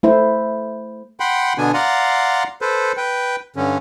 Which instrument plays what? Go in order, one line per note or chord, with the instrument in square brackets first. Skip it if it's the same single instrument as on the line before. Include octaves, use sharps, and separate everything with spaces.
[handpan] A3 E4 C5
[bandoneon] F#5 G5 B5 C6
B2 D3 B3 D4 G#5
D5 F5 F#5 A#5 C6
A4 B4 C5
B4 G5
G2 D3 C#4